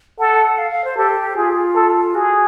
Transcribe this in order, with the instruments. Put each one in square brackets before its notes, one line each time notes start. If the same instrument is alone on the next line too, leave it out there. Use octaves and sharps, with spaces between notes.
[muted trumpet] A4 [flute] F#5
[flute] F5
F5
C5
[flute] G4 [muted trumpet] A4
[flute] F4 [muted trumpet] G#4
[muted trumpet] A4
[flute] F#4 [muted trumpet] G#4